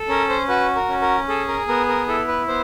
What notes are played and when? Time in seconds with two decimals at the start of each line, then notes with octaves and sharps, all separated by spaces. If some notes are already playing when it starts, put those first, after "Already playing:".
Already playing: A4
0.09 C#4 A#4
0.29 C5
0.48 F#4 B4
0.75 A#4
0.89 C#4
1.01 A#4
1.29 G#4 A4
1.48 A#4
1.68 B3 A#4
1.89 A#4
2.08 E4 A4
2.28 B4
2.48 B3 C5